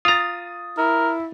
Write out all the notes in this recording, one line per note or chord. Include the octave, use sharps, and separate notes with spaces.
F4 A#5 D#6 A6
E4 A#4